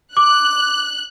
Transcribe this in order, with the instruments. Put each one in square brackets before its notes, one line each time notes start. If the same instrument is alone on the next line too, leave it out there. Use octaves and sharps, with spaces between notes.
[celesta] D6 [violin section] F#6